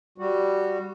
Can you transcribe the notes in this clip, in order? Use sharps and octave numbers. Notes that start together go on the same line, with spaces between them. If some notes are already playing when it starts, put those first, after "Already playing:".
G3 F#4